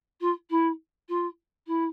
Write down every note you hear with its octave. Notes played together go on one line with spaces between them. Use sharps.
F4
E4
F4
E4